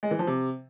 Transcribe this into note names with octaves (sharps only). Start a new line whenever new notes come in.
G#3
E3
F3
C3